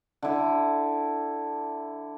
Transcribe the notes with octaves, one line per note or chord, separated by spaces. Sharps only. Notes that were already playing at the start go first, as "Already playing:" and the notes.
D3 E4